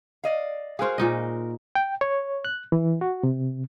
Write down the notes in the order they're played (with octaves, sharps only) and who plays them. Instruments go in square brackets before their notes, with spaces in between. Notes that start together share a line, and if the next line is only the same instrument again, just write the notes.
[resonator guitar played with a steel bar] D5 D#5 F5
[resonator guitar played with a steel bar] F#4 A#4 F5 [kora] G#4 C5
[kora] A#2 D#4 D#5
[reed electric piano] G5
C#5
F#6
E3
F#4
C3